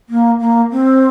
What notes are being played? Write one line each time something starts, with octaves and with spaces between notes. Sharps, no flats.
A#3
A#3
C4